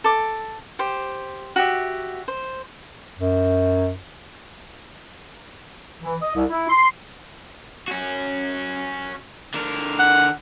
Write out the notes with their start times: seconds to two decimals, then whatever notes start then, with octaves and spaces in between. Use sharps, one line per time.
0.04 A4 D6
0.79 G4 C5
1.56 F#4 G4 E5
2.28 C5
3.19 F#2
6.03 E3
6.22 D#5
6.35 C2
6.50 E4
6.69 C6
7.88 C#4 F#4
9.54 D3 A#4
9.99 F#5